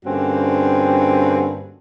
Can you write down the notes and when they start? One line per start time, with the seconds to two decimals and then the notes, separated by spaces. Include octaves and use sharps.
0.05 G2 D3 A#3 C4 C#4 F#4